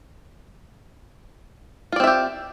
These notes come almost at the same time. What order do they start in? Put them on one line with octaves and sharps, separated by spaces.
F4 D5 C4 E5 G4